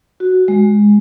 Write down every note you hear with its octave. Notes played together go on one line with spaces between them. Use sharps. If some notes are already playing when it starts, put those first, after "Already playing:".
F#4
G#3